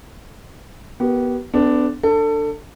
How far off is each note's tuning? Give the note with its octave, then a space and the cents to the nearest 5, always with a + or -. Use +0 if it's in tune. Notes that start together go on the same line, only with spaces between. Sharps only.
B3 -15 G4 -35 A#4 +0
B3 +35 D4 +0 A4 +0
D4 +10 A4 +25